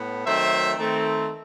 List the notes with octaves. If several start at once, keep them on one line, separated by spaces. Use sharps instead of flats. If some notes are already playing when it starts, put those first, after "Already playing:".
Already playing: A2 B3
D#3 F#3 A3 C4 C5 E5
D#3 A3 C4